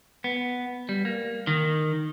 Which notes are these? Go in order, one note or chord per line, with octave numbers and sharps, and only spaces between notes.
B3
G3
A#3
D#3